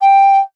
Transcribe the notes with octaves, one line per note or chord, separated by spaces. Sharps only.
G5